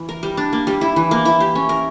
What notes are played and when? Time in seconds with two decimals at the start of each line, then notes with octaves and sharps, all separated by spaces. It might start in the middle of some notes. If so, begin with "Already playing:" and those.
Already playing: E3
0.09 A#4
0.23 G3
0.37 D4
0.53 A#3
0.67 G3
0.81 E4
0.96 E3
1.11 A#3
1.25 E4
1.40 G4
1.55 C#4
1.69 A#4